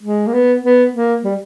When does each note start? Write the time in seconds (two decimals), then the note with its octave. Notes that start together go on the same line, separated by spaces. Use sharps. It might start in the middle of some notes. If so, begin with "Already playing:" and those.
0.03 G#3
0.27 A#3
0.34 B3
0.64 B3
0.94 A#3
1.24 G3